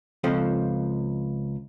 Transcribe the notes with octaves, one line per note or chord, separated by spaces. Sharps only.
C#2 F3 C4 A4 D#5